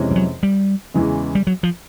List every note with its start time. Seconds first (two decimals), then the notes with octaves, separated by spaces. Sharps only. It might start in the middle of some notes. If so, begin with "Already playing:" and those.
Already playing: F2 C3 E3 G#3 C#4
0.11 G3
0.16 F#3
0.43 G3
0.94 E2 C#3 E3 G#3
1.35 G3
1.47 F#3
1.63 F3